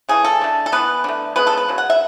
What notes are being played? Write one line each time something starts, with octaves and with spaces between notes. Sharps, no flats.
C#3 E3 A3 G#4
A4
D3 A3
A4
E3 B3 B4
D3 A3
C#3 G#3 B3 B4
A4
B4
C#3 F#3
F#5
E5